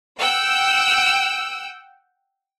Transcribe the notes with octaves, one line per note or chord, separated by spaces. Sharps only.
F#5 G5 E6